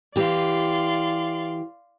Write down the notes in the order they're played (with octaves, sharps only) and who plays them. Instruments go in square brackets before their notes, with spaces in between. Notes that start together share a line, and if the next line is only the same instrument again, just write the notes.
[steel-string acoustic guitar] E3 G4 [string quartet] D5 F5 C6